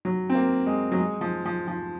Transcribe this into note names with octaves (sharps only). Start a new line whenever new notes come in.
F#3
C4
A#3
G#3
F#3
G#3
F3
F3
F3